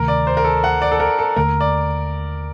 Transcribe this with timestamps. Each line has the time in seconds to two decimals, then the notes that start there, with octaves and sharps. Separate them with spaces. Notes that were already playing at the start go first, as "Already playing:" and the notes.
Already playing: D2 C3 D#3 A3 A#4
0.08 D5
0.27 C5
0.37 A#4
0.45 A4
0.64 F#5
0.82 D5
0.92 A4
1.00 A#4
1.19 A4
1.36 D#2 D3 A3 A#4
1.61 D5